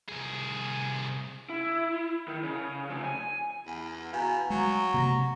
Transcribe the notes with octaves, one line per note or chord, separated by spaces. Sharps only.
C2 G#4
E4
D#3
C#3
C3 F3
G#5
E2
B2 F5 G#5 A#5
F#3 G#3 F#5 C#6
C3 A#3 A#5 A#6